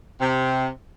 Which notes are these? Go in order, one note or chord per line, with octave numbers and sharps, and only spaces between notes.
C3